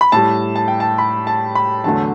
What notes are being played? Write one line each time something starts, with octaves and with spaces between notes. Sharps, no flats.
B5
A2 G3 A5
A5
G5
A5
B5
A5
B5
E2 D3 F#3 A3 A5